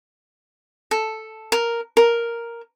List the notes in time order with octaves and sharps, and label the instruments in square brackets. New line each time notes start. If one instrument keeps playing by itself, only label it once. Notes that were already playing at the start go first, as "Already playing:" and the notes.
[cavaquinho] A4
A#4
A#4